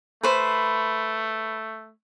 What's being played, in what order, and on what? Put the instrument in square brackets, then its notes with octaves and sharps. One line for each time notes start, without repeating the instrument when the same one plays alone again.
[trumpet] A3 [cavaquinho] B4 C5